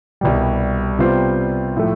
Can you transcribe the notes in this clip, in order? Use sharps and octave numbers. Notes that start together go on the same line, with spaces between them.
C2 B2 G3
C3 G3 B3 F4 C5
A2 F3 A3